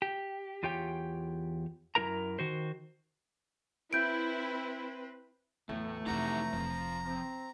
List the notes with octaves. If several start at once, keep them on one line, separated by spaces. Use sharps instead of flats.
G4
E2 F4 G4 C#5 G5
F#2 G3 E4 A#4 A#5
D#3 F#4 C5
C4 E4 B4 G6 D7
E2 A2 E3 F#3 A3
F2 C3 D#4 G4 F#5 A#5
F1 F3
C4